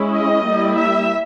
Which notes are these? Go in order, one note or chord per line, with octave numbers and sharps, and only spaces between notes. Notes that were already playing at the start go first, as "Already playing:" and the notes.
Already playing: G#3 C#4 E4
D#5
G3 A#3 E4
E5